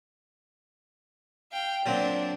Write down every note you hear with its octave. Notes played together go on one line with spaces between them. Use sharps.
F5 G5
A#2 F#3 C4 D4